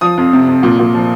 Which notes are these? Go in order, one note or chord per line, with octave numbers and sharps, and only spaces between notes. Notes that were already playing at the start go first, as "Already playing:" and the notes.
F3 D#6
F2
C3
F2
A#2
A#2
F3